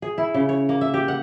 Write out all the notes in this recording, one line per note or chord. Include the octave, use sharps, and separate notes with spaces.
G#4
E4
C#3
C#5
A#3
E5
G4
F#5